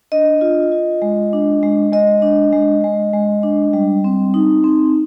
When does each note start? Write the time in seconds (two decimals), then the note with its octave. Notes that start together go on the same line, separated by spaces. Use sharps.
0.12 D4 D#5
0.41 F4
0.72 F4
1.02 G#3
1.33 D4
1.63 G#3
1.92 G#3 D#5
2.22 D4
2.52 G#3
2.84 G#3
3.13 G#3
3.43 D4
3.73 G3
4.04 C4
4.34 D#4
4.64 C4